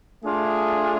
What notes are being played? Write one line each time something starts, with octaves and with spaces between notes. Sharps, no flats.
A3 D4 F4 G#4